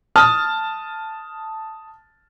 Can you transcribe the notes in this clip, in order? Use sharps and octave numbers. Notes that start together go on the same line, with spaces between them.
A5 D#6 F6